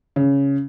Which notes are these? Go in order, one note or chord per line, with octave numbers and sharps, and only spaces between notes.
C#3